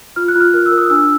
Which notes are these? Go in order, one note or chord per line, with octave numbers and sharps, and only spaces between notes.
F4 F6
F#6
F4 F6
A#4 F6
E6
A#4
D#6
D4 E6